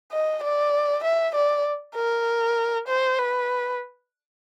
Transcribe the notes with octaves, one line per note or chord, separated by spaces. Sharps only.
D#5
D5
E5
D5
A#4
C5
B4